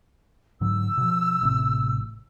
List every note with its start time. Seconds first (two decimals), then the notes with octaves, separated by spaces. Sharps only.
0.61 G#2 D3 F#3 E6
0.98 B2 F3
1.42 A1 A2 C3